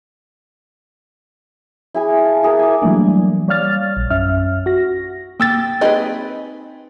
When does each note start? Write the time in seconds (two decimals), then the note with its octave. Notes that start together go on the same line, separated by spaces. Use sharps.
1.94 E4 G#4 G#5
2.10 F5
2.25 A5
2.43 E4 G#4 A#4
2.59 G#5 D6
2.82 E3 F#3 G3 A3 A#3 D4
3.48 G3 C#5 D5 F5 F6 A6
3.97 A#1
4.10 F#2 C#4 E5 F6
4.66 F#4 A#6
5.40 A#3 G4 E6 A6
5.81 C4 D#4 G#4 B4 D#5